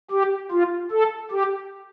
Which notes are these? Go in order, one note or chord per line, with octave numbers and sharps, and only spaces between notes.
G4
F4
A4
G4